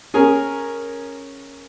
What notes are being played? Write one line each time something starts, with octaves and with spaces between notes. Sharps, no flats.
C#4 G#4 A#4 G#5